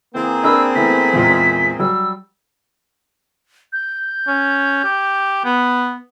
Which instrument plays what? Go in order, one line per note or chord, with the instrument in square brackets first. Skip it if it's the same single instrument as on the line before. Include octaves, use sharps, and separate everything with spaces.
[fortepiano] E3 [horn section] A#3 C4 G#4
[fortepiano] D4 A#4 B4 [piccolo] E6
[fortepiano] E3 A3 B3 [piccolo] B6
[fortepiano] E2 A#2 G#3
[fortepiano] F#3 G3 [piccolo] E6
[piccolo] G6
[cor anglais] C#4
G4
B3